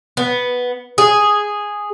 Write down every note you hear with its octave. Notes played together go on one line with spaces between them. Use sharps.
B3
G#4